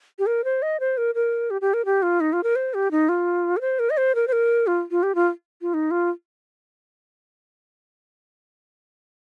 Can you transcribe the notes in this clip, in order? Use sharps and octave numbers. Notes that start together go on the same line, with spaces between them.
G4
A#4
C5
D#5
C5
A#4
A#4
G4
G4
A#4
G4
F4
D#4
F4
A#4
C5
G4
D#4
F4
A#4
C5
A#4
D#5
C5
A#4
C5
A#4
F4
F4
G4
F4
F4
D#4
F4